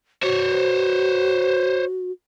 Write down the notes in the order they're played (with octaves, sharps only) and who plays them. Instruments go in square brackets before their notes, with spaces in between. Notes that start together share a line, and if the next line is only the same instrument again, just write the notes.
[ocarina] F#4 [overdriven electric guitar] C5 C#5